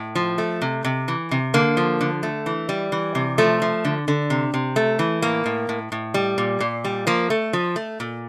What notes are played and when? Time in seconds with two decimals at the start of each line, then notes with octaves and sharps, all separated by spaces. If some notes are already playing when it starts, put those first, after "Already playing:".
Already playing: A2
0.15 F3
0.38 A3
0.62 C3
0.84 C3
1.08 E3
1.31 C3
1.54 D3 A#3
1.77 F3
2.01 D3
2.23 A3
2.46 E3
2.69 G3
2.92 E3
3.15 C3
3.38 F3 A3
3.62 F3
3.85 D3
4.08 D3
4.30 C3
4.54 C3
4.76 A3
4.99 E3
5.22 A2 A#3
5.46 A2
5.69 A2
5.92 A2
6.14 G3
6.38 A#2
6.60 A#2
6.84 G3
7.07 F3 A#3
7.30 A3
7.53 F3
7.76 A3
8.00 A#2